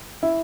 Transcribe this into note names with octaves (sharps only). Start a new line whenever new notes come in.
E4